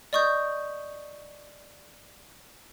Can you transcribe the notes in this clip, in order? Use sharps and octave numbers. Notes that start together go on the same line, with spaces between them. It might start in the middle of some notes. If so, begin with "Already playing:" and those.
D5 D#5 C#6 D#6 G6